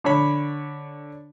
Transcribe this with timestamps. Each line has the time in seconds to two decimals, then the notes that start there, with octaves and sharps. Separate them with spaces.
0.04 D3 D4 C#5 B5